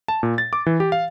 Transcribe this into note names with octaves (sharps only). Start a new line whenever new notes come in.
A5
A#2
A6
D6
E3
G4
F5